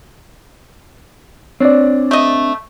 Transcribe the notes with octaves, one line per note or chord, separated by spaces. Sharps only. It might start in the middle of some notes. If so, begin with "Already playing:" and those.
C4 D4 C#5 D5
A3 D#5